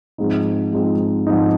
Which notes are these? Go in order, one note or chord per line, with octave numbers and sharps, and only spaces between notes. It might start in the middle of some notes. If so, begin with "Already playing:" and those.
G#2 F3 G#3 C4 D#4
G#2 F3 G#3 C4 D#4
G#2 F3 G#3 C4 D#4